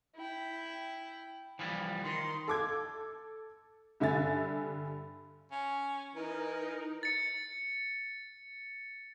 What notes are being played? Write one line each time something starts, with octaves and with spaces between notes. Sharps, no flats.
E4 G5
E3 F3 G3
D#3 C6
A4 D6 G#6
G2 D3 E5 G#5 A6
C#4
E3 D#4 A#4
A6 C#7